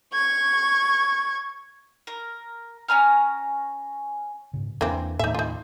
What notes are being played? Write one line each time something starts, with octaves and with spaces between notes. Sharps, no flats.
C#6 G#6
A#4
C#4 G#5 A#5 F6
G#2 C#3
E2 E3 A#3 C4 D4
D#2 A2 D#4 E5
D#4 F4